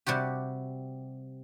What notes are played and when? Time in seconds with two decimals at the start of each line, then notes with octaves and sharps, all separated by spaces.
0.06 C3 G3 F#4 G4